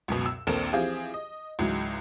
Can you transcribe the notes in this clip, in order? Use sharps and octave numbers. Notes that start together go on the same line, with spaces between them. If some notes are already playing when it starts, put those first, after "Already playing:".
C#2 F#2 B2
E6
A#1 D#2 C4 A4 A#4 E7
E3 F3 C4 F4 G4 G#4
D#5
C#2 G#2 E3 F#3 G#3